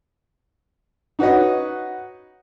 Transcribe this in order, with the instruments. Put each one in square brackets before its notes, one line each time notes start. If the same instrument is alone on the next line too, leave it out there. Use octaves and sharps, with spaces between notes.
[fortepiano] D#4 F#4 B4 C#5 D#5